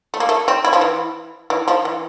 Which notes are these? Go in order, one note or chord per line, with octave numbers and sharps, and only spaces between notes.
A3
A#3
A3
C4
E4
F3
E3
E3
F3
E3